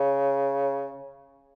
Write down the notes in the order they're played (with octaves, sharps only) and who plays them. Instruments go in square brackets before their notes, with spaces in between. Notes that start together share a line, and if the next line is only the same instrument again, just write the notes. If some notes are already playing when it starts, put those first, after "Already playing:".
Already playing: [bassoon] C#3